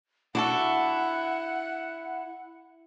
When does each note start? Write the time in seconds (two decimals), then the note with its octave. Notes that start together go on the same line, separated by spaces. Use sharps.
0.35 D4 E4 F#4 A4 F#5